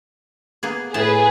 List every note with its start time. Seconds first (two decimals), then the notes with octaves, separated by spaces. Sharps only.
0.63 A#3 B3 G#4
0.94 A2 G#4 B4 A5